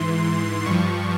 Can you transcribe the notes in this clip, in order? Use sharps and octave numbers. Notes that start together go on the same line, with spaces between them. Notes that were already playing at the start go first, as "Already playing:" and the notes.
Already playing: G#2 E3 C6
G2 F3 C#6